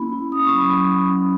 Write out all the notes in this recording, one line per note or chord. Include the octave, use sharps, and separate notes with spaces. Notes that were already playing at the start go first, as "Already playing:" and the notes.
Already playing: A#3 B3 C#4 E4 B5
E4
C#4 D#6
C#6
F#3
B5
F#3
F#3
C#4